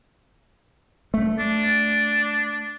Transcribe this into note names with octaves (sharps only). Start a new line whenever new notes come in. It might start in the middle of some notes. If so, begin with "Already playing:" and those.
A3
D4